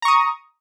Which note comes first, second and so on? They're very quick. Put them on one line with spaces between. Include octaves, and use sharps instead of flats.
A#5 C#6 D#6